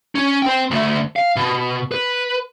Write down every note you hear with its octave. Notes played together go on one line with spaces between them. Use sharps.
C#4
C5 G5
D2 A3
F5
B2
B4